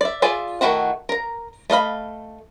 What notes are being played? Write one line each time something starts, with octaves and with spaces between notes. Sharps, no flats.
D5 E5
F4 G#4 D5 E5
D#3 A3 E4 F#4 F#5
A#4 A#5
A3 D#5 F5 B5